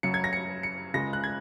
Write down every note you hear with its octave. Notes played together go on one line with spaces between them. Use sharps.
F#2 C#3 F#3 C#7
G#6
A#6
C#7
C#7
C#2 C#3 G#3 A#6
F#6
G#6